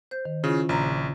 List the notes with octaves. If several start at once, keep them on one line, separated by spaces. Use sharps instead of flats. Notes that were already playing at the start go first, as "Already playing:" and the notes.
C5 G6
D#3
C#3 C#4 E4 F4
A#1 C#3 A#5